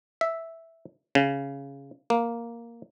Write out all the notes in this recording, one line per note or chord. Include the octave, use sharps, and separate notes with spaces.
E5
C#3
A#3